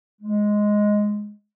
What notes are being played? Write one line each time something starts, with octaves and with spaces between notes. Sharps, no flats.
G#3